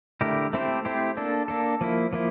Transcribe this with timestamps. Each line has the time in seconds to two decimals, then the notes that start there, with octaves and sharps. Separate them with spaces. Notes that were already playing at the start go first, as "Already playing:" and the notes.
0.21 D3 A3 E4 G4 A#4
0.53 A3 C4 E4 G4 C5
0.85 A3 C4 E4 G4 C5
1.17 A#3 D4 A4
1.48 A#3 D4 A4
1.81 F3 A#3 E4
2.13 F3 A#3 E4